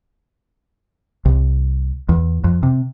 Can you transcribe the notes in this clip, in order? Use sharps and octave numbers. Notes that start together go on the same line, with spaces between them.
C2
E2
F2
C3